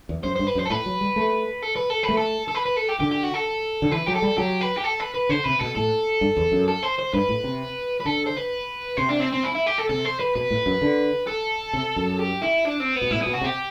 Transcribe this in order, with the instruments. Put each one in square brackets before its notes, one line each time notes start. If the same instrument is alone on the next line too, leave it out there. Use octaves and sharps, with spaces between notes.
[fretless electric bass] E2
[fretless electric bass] F#2 [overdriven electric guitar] C5
[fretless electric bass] G2 [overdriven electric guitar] C5
[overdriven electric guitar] B4
[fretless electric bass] F#2
[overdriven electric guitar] C5
A4
[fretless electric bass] A2 [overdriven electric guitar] B4
[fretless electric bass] F#3
G3
A3
[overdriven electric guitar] A4
B4
A4
B4
[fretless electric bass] A3
[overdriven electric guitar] A4
A4
B4
B4
A4
G4
[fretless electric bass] D3 [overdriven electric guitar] G4
[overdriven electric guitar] G4
F#4
A4
[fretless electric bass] D3
[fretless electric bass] E3 [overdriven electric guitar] B4
[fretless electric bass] F#3 [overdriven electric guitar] G4
[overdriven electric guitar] A4
[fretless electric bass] G3
[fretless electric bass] F#3 [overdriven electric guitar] G4
[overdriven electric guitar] B4
G4
A4
B4
B4
[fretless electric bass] D3 [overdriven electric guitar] C5
[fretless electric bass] C3 [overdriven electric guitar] B4
[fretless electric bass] B2 [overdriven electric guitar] A4
[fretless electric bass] A2 [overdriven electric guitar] A4
[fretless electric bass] G2
E2
F#2
[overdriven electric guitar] A4
C5
C5
[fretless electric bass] G2 [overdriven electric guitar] B4
[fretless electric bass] A2
C3
[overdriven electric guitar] B4
[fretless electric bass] D3 [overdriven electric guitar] A4
[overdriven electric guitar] C5
B4
[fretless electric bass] C3 [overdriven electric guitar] C5
[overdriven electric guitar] D4
C4
C4
E4
E4
G4
A4
[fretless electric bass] C3 [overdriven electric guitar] A4
[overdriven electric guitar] C5
B4
[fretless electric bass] B2 [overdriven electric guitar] B4
[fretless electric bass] A2
F#2
D3
[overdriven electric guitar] A4
[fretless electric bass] C3
F#2
[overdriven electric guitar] G4
E4
D4
C4
B3
[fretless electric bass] B2
[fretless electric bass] A2 [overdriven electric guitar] E4
[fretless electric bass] B2 [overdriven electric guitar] B3
[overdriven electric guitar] F#4
[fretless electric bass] C3
[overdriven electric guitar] G4